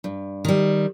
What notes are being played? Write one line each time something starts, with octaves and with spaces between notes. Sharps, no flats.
G2
D#3 G3